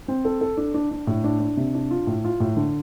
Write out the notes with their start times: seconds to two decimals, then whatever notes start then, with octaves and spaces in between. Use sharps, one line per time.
0.08 C4
0.25 A4
0.41 A4
0.57 D4
0.74 D4
0.91 D4
1.07 A2
1.24 D4
1.40 D4
1.57 C3
1.75 D4
1.91 F4
2.07 A2
2.24 F4
2.40 A2
2.57 D3